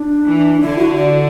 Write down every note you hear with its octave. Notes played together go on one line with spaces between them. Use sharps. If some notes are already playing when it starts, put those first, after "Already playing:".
Already playing: D4
E3
D3 E4
F#4
D5